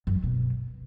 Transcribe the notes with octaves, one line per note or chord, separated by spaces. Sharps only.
F#2
F#3
B2